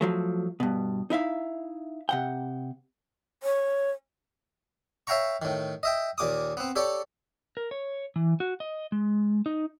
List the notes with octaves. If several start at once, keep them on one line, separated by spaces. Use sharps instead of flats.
F3 F#3 A3
G2 B2
D#4 E4 E5 F5
C3 F#5 G5
C#5
C#5 E5 F5 G5 A#5 C#6
A2 D#3
D#5 E5 G5
D#2 A#2 D6 D#6
B3 C4
G4 A4 C#5 D5
A#4
C#5
E3
F#4
D#5
G#3
D#4